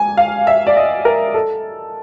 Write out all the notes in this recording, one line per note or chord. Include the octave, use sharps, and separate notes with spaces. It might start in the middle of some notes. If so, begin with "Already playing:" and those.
Already playing: G#5
F5
E5
D5
D#5
A#4
A4